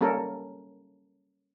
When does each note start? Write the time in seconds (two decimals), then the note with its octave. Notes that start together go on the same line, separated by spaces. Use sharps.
0.01 G3 A#3 C#4 A4 A#4